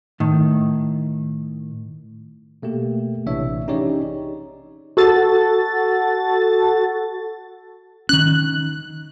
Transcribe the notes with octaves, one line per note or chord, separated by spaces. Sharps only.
A2 D#3
B2 A3 A#3 G4
A#1 C3 E3 D4 C#5 E5
C#4 D#4 G4 G#4 C#5 D5
F#4 A4 A6
D#3 C#4 F#6